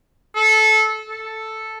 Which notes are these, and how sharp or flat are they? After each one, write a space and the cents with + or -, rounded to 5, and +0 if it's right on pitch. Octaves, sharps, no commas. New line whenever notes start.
A4 -20
A4 +0